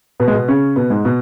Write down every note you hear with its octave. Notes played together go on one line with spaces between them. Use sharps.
B2 B3
G#3
B2 B3
C#3 C#4
B2 B3
G#2 G#3
B2 B3